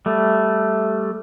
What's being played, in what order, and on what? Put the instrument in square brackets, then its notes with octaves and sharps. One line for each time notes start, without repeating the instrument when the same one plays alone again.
[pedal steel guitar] G3 A3